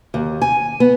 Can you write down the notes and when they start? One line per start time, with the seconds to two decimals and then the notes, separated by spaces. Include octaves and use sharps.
0.14 D#2
0.42 G#5
0.80 B3